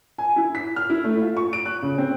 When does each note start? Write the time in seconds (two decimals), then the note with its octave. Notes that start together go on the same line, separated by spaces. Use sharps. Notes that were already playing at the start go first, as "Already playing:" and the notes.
0.18 G#5
0.36 E4
0.55 B6
0.76 F6
0.90 E4
1.04 A3
1.22 F4
1.37 C#6
1.53 D7
1.66 F#6
1.82 C#3
1.98 C4